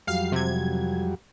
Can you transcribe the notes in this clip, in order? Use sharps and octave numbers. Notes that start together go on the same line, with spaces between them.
F2 F#3 G3 F5 C7
C3 G#6